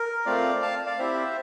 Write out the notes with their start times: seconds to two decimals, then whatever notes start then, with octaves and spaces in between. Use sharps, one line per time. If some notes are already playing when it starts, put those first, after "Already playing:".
Already playing: A#4
0.26 A3 C4 F4 D5 F5
0.62 F5 A5
0.86 D5 F5
0.99 C4 E4 G4 C5 E5